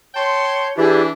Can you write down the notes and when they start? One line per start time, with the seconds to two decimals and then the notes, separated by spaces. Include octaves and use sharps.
0.14 C#5 G5 A5 C6
0.77 E3 D4 E4 G4 G#4 D5